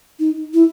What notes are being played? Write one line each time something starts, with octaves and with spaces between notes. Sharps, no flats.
D#4
E4